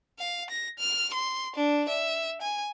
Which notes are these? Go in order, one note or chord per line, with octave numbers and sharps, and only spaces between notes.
F5
A#6
F6
C6
D4
E5
G#5